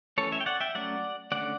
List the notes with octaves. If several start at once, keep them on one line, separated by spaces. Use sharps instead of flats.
E3 A3 C#4 A4 C#5
C#5 E5
G5
D5 F#5
E5 G5
F#3 A3 C#4 D5 F#5
D3 A3 C#4 D5 F#5